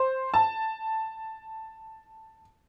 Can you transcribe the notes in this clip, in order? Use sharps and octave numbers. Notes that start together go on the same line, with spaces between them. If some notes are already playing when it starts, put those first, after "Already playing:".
Already playing: C5
A5